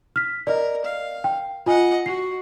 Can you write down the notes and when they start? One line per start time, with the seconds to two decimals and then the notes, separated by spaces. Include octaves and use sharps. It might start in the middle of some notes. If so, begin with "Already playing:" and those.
0.16 F6 B6
0.47 A#4 D5 D#5
0.85 F5
1.24 G5
1.66 F4 D#5 F#5 G#5
2.06 F#4 C7